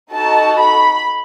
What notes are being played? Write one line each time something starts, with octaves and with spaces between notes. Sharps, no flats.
D#4 F#4 A4 A5
B5